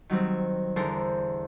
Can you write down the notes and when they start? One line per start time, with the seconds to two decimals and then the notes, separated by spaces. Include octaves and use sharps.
0.10 D#3 F#3 G3 C4
0.76 E2 D3 A4 A#4 C5